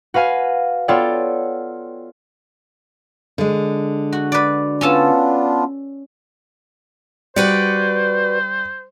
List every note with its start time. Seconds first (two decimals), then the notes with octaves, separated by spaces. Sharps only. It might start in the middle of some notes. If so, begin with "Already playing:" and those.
0.14 F#4 B4 F5 G#5
0.88 B3 F4 A4 C#5 D5 G5
3.38 D3 G#3
4.13 F#4
4.32 B4 D5
4.81 B3 C#4 D4 F4 A4 A5
7.36 G3 F#4 B4 C5 D5 C#7